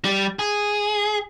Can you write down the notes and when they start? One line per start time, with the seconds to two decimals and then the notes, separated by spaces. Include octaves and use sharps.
0.05 G3
0.39 G#4